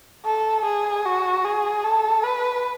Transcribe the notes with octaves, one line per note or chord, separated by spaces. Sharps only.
A4
G#4
F#4
G#4
A4
B4